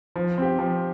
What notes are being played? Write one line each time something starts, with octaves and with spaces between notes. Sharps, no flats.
F3
C4 G4
F3